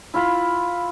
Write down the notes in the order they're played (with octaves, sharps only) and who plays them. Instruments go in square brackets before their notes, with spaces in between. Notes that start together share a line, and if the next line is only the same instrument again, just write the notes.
[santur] E4 F4 B5